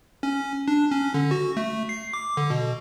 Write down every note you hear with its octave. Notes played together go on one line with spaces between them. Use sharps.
C#4
D4
C#4
D3
F#4
A3
C7
D6
D3
B2